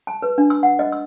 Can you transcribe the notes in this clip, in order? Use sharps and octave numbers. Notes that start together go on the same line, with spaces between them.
A5
B4
D4
E6
F#5
D#5
E6